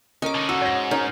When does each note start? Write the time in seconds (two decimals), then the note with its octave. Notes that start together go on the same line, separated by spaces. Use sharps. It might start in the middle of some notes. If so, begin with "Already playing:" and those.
0.22 C#4 A#4 D#5 D6
0.35 D3 D#4
0.49 F#4 E6
0.62 G#2 C#5 A#6
0.91 C#4 D#4 A#4